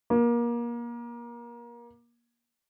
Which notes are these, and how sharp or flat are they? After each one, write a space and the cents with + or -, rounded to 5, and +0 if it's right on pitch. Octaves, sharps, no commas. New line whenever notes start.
A#3 +30